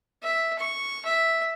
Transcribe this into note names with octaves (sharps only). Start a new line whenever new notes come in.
E5
C#6
E5